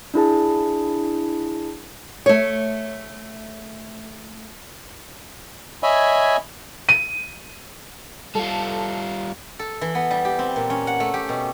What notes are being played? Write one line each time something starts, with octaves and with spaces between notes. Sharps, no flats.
D4 E4 G#4 A5
A3 C#5
C#5 D#5 E5 G#5 B5
D#7
G3 F4 A4
A4
E3
B3
G3
G4
C4
A#2
C#4
F#5
A3
G4
B2